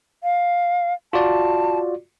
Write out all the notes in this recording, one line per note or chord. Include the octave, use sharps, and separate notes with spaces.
F5
F4 F#4 D5 A5